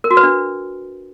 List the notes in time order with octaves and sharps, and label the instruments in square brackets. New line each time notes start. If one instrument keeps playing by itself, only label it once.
[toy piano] A#4
F#4
B4
D4